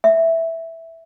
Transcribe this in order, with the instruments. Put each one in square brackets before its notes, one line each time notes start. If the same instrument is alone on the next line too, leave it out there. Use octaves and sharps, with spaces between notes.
[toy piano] E5